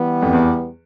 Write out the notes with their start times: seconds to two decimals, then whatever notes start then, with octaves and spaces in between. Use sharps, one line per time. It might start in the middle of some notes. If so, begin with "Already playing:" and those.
Already playing: E3 G3 B3
0.22 F2
0.33 E2